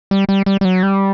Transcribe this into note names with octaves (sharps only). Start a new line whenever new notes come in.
G3
G3
G3
G3
F#3
G3